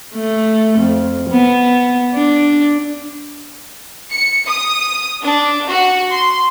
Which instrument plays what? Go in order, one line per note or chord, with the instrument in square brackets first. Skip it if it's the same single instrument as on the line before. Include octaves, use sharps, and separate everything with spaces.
[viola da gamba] A3
F2
B3
D4
[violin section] C#7
D#6
D4
F#4
C6